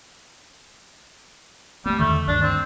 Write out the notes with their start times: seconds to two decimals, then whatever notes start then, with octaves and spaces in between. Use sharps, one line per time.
1.86 G3 A3 B3
1.99 E2 D3 D#3 A3
2.28 D2 G2 D#3 D4
2.43 C4